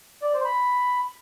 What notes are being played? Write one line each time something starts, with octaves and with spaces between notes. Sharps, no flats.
D5
C5
B5